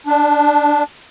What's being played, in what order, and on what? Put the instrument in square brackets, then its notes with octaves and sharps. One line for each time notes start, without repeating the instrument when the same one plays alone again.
[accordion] D4